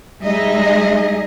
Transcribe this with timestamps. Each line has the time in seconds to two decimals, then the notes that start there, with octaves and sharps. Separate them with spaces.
0.22 G3 G#3 D#4 G#4 D#5 E5